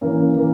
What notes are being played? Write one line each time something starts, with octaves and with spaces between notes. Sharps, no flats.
E3 A#3 C#4
E3 A#3